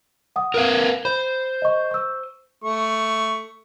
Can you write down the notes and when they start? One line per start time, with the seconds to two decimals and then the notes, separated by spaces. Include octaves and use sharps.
0.36 F#5 D#6
0.54 A#4 B4 F5
1.05 C5 B5
1.62 D#5 C#6
1.91 C#6 E6
2.64 A3 C#6